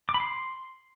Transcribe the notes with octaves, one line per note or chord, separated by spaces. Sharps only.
D6
B5
C6